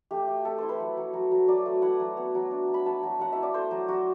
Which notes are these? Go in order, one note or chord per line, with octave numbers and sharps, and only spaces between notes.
A3 G4
A3
A3 A4
E4 C5
B4
F#3
F#3
F#3
F#3
F#3 D5
A3
E4 F#5
F#3
B3
F#3
D4
F#3
B5
F#3 A5
F#3
F#3 F#5
E4 E5
D5
A3 C5
F#3
F#3 F#4